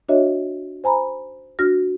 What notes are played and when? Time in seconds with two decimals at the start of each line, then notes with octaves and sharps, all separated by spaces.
0.09 D4 F#4 C#5 D#5 E5
0.84 C5 G#5 A#5 B5
1.59 D4 F#4 F6 A#6